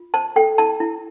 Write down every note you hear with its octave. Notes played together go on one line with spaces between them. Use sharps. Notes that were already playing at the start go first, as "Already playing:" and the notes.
Already playing: F4
C5 A5
A4 G5
E4 A5
E4